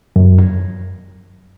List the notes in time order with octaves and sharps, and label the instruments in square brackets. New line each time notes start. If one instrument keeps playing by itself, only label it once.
[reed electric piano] F#2